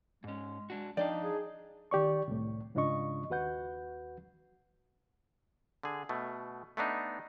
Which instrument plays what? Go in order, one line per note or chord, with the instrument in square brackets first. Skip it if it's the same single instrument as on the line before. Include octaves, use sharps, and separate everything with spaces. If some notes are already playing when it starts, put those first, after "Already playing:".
[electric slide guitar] G#2 C#4 [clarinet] G#3
[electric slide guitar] G#3 D4 F#4
[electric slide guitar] F3 D#5 F5 [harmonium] D4 D#4 [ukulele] D5 [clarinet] G5
[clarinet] G#4
[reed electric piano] D#3 G4 D5 C#6
C2 A2
G#2 C#3 D4 F4 D#5 C#6
D#2 F#4 B4 F#5 G6
[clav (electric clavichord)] D3 G#4
B2 A3
A3 B3 D4 D#4